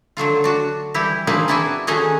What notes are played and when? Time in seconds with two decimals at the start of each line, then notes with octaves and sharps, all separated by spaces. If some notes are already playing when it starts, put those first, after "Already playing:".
0.17 D3 F#3 A3 F4
0.44 D4 F#4
0.94 E3 G3 E4 G4
1.27 A#3 C4 D4 D#4 G#4 B4
1.48 B3 D4 E4 F#4 D5 G#5
1.87 D#3 A3 C#4 D#4 F#4 G#4